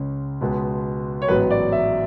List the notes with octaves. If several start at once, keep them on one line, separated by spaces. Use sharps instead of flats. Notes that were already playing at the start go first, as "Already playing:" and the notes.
Already playing: C#2 C#3 G#3
C#2 B2 G#3 B3
C#5
A1 G#2 F#3 B3 B4
D5
E5